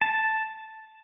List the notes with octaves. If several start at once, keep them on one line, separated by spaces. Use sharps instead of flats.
A5